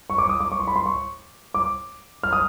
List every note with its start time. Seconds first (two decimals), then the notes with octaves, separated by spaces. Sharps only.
0.10 C#6
0.18 D6
0.29 D#6
0.40 D6
0.52 C#6
0.60 C6
0.67 B5
0.76 C6
0.86 C#6
1.54 D6
2.23 F6
2.33 D#6